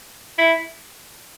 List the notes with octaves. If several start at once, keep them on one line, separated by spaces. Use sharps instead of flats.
E4